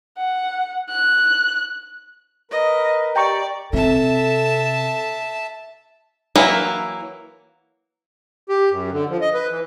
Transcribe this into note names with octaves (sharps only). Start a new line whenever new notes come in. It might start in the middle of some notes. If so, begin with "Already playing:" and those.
F#5
F#6
A#4 B4 D#5
G4 D5 G5 A#5 C#6
C3 A4 E5 A5
E3 F#3 A#3 E4
G4
F#2
D3
F3
D#5
B4
E3